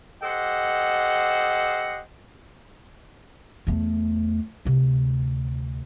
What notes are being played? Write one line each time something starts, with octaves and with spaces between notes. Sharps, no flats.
G4 A4 C5 D#5 F#5
E2 A3
D2 C3